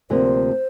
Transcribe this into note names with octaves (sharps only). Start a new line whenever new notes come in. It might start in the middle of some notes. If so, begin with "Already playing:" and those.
D2 C3 F3 A#3 C5